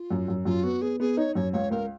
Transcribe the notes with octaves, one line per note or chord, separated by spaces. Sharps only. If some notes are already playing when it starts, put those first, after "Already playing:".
Already playing: F4
F#2
F#2
F#2 F4
B3 F#4
B3 G#4
B3 G#4
D#4 C#5
F#2 C#5
C#2 C#5
C#2 A#4